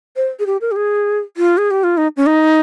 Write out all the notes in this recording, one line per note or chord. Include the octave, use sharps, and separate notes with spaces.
C5
G#4
G4
A#4
G4
G#4
F4
G#4
G4
F4
D#4
C#4
D#4